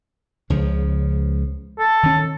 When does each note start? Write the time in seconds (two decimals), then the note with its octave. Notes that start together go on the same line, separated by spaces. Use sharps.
0.50 C#2 C#3 F3
1.79 A4
2.03 D#3 C#4